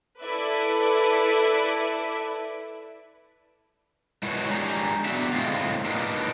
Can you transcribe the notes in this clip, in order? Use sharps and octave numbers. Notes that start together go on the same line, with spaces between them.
E4 A4 B4 D5 E5
G#3 E4 F#4 A#4 B4 C#5
G#3 D4 G4 G#4 A#5
B3 D4 F#4 E5
A2 G#3 C4 F4
A#3 D4 D#4 A#4 B4